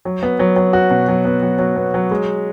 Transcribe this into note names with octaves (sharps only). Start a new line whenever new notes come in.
F#3
B3
F#3
F#3
F#4
B2
F#3
B3
F#3
F#3
B3
F#3
G#3